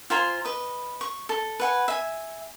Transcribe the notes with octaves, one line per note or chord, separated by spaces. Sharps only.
F4 C5 G#5 A#5
B4 D#5
C#6
A4
B4 F#5 G#5
E5 G#5